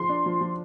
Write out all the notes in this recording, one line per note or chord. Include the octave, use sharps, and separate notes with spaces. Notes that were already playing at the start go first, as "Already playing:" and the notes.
Already playing: F3 C6
D4
F3
F3